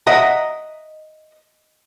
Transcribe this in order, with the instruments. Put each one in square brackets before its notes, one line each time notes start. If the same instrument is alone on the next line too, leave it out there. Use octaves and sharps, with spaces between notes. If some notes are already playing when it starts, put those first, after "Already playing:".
[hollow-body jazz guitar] D#5 E5 F#5 A#5